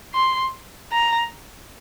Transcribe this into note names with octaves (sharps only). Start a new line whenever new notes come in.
C6
A#5